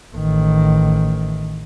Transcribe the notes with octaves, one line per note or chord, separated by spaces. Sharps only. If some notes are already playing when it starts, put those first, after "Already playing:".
A1 D#3